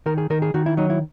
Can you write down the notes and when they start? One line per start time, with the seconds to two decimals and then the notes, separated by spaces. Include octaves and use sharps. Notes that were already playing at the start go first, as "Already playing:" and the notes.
0.06 D#3 A#4
0.18 G#4
0.30 D#3 A#4
0.42 G#4
0.54 D#3 F#4
0.66 E4
0.77 F#3 D#4
0.90 E4